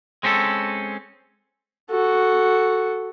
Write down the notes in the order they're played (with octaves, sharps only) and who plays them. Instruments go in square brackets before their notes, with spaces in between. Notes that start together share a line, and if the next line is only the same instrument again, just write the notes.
[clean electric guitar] G#3 C4 C#4 G4 A4
[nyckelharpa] F#4 A4